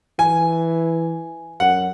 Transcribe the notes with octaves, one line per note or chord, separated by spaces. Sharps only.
E3 G#5
F#2 F#5